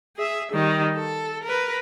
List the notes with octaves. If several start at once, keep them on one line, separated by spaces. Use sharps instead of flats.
G#4 E5
D#3 G3
A4
A#4 B4